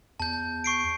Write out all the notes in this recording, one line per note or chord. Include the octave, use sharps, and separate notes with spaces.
E2 A5 G6
C#6 C7 D7